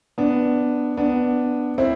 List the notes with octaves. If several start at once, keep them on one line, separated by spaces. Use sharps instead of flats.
B3 D4
B3 D4
C4 E4